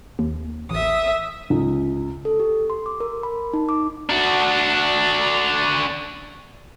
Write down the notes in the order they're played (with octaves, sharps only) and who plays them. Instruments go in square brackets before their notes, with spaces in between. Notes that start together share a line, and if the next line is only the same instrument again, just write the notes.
[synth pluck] D#2
[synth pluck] A1 [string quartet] E5 D#6
[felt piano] C#2
[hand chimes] A4
G4
C6
D6
A#4
B5
D#4
D6
[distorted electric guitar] D4 F#4